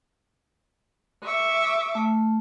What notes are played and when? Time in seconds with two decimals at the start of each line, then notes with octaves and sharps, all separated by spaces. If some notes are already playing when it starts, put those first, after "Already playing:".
1.23 E5 C#6 D6
1.95 A3